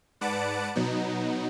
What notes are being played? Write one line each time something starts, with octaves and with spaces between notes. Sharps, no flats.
G#2 B4 D5 F#5 A5 D7
B2 F#3 B3 D#4